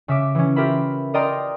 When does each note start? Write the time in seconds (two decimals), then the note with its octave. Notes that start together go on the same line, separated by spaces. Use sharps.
0.08 C#3 E5 D6
0.35 E3 C#4
0.56 F4 G4 A#4 E5 B5
1.14 A#4 D5 D#5 G5 A#5 C6